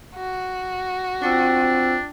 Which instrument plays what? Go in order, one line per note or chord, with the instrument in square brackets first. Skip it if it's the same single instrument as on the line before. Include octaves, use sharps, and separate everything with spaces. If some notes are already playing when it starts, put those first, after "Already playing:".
[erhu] F#4
[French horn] C4 [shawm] D4 [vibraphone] F4 G5 E6